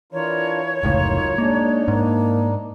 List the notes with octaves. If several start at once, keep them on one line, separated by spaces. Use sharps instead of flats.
E3 D4 F4 A#4 C#5
F1 C#2 F#2 A2 D#4 F4
G#3 A#3 D4 D#4
G#2 A#3